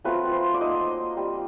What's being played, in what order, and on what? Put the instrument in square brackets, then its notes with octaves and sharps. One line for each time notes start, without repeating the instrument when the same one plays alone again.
[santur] F#3 A3 C4 F4 B4
C5
D5
A#3 D#4 D#5
G3 C4 F4